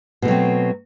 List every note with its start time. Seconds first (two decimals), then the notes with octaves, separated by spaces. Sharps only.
0.22 B2
0.25 A3
0.28 F#3
0.31 C4